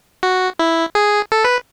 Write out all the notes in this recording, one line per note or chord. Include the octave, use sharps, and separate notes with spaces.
F#4
E4
G#4
A4
B4